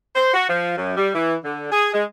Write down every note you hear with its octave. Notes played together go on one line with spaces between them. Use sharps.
C5
F#4
F3
F#2
G3
E3
D3
G#4
G#3